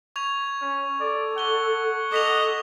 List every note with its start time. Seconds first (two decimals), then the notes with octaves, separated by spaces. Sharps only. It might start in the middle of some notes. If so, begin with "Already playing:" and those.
0.16 C#6 G#6 F7
0.61 C#4
1.00 A4 D5
1.38 F#5 C#6 G7
2.12 A4 D#5 D6 B6 F7